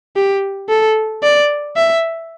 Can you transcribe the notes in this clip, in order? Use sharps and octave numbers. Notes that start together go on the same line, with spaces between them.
G4
A4
D5
E5